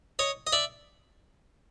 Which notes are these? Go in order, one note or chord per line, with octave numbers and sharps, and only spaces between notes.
C#5 D#5
D#5
D5 E5